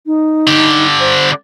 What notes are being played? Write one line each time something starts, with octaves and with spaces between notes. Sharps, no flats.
D#4
D3 G4
C5